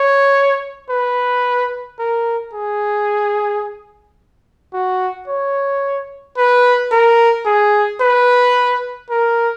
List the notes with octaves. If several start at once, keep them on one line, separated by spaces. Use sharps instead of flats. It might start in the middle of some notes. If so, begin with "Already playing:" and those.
Already playing: C#5
B4
A#4
G#4
F#4
C#5
B4
A#4
G#4
B4
A#4